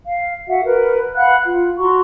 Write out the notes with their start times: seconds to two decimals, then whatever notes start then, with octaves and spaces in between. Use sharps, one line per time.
0.05 F5
0.48 F#4 E5 F#5
0.64 A#4 B4
1.15 F5 F#5 B5 F#6
1.44 F4
1.77 F#4 A#5 C6 C#6